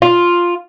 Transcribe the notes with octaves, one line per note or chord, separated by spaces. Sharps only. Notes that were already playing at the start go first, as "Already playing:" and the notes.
F4